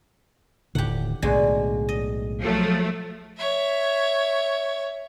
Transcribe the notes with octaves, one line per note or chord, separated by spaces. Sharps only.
D#1 A2 D3 G4 F#5
B1 A2 D3 G#3 F#4
D#5
F3 F#3 A3
C#5 E5